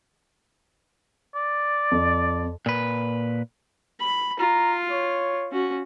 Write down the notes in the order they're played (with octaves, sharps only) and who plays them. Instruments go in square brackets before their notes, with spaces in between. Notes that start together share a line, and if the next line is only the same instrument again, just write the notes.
[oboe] D5
[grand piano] F2
[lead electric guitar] A#2 B4
[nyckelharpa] B5
[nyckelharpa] F4 [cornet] A#5
[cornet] C#5
[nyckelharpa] C#4 F#4